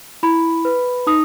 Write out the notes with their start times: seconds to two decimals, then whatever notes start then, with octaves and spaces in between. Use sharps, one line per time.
0.23 E4 B5
0.65 B4
1.07 D#4 D#6